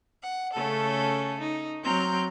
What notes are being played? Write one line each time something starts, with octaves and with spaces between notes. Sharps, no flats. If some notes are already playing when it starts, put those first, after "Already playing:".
F#5
C#3 A3 C#4 A4
D#4
F#3 C4 A#5 F6 G6